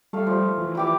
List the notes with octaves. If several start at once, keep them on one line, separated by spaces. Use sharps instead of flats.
G3 A3 F5
F3
E3
E4 G4 D6